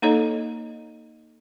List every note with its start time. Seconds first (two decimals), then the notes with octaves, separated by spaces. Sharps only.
0.02 A#3 D#4 A4 C#5 D#5